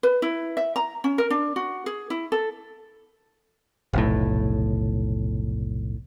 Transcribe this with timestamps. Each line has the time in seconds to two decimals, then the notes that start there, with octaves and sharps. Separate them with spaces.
0.03 B4
0.22 E4
0.57 E5
0.76 A#5
1.04 C#4
1.18 A#4
1.30 D4
1.56 F#4
1.86 G#4
2.10 E4
2.32 A4
3.93 F1 B1 A2